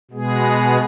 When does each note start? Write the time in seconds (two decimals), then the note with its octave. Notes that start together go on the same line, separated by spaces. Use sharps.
0.11 B2 G#3 B3 G#4